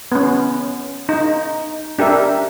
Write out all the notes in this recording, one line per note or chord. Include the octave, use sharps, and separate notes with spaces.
B3 C#4
D#4
D4 G4 A#4 E5